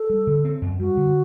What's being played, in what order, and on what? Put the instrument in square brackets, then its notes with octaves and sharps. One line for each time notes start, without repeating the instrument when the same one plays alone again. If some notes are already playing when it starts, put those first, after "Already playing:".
Already playing: [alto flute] A4
[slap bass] G3
D3
C4
F#2
[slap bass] G3 [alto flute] F#4
[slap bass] D3